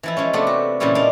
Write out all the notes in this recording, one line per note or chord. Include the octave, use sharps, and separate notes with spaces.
E3 F3 E4
F3 G#3 C#4
C3 A3 B3 D4 G4 C5
F#4
A#2 C#3 E3 G3 C#4 E4
A#3 D4 D#4 F5